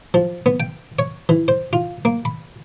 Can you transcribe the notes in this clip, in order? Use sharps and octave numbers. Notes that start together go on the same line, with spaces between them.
F3
B3
G5
C#5
E3
C5
F4
A#3
B5